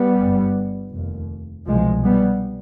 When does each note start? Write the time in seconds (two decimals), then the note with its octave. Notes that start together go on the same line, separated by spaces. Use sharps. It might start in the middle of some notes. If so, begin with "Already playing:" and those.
Already playing: G3 B3
0.19 G1 G2
0.93 F1 D#2
1.67 C2 B2 F3 G#3
2.04 G3 B3